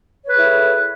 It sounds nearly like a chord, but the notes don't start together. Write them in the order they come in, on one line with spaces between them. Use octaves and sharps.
C#5 B4 G#4 E4 A4